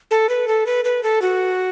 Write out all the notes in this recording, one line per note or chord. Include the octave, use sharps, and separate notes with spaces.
A4
B4
A4
B4
B4
A4
F#4